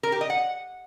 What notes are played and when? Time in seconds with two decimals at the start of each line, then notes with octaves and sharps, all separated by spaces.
0.03 A#4
0.12 G4
0.21 D#5
0.30 F#5